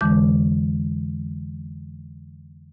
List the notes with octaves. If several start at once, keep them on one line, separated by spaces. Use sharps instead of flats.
F2 D3 E3 G#3 D6 G6